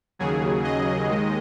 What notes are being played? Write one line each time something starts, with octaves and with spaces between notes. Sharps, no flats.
D#2 C#3 F#3 G#4
D#5
D#2 D#3 G#3